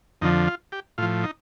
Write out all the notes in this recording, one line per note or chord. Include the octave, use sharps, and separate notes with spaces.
F2 D3 F3 D#4
F4
G4
A2 F3 F4
D#4